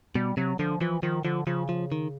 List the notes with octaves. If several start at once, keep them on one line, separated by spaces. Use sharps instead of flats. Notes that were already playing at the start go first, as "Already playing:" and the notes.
B2 G3
C3 F#3
D3 F3
E3 F3
D#3 F3
D3 F3
C#3 F3
F3
D#3